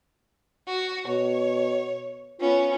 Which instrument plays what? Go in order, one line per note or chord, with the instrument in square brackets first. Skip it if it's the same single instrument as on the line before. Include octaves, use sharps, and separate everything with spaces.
[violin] F#4
[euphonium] B2 [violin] C#5
[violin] B3 C#4 [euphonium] F4